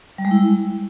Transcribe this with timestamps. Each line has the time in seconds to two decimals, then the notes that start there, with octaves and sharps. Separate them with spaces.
0.18 G3
0.25 G#3
0.31 E4